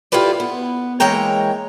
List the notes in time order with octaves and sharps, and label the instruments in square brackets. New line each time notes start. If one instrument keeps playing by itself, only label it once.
[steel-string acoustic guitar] E4 F4 G4 A4 B4 D5
B3
E3 G#3 A#3 C#5 G5 A#5